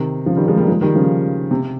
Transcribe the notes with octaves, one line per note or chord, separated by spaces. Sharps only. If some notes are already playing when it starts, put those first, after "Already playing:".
Already playing: C3 D#3
C#3 F3
D#3 G3
F3 G#3
G3 A#3
F3 G#3
D#3 G3
C#3 F3
C3